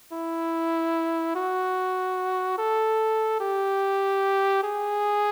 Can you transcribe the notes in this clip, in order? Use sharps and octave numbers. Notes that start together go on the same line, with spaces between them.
E4
F#4
A4
G4
G#4